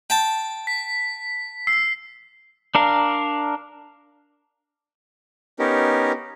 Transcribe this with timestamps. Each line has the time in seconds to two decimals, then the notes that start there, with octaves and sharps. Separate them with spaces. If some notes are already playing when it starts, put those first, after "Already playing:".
0.10 G5 A5
0.67 B6
1.67 E6 C7
2.75 D4 A#4 F5
5.59 B3 C#4 D#4 G4 A#4